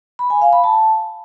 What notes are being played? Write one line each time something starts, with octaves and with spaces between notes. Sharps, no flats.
B5
G#5
F5
B5
A5